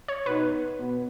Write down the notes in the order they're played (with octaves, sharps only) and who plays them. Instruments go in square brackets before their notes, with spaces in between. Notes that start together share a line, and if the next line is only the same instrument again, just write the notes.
[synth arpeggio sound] C#5
[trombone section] B2 B3 D#4 [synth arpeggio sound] B4
[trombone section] B2 B3